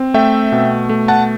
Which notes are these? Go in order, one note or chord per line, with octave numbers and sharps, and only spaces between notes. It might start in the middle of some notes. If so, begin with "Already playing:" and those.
Already playing: C4
A3 E5 G5
B2
A3
F#5 A5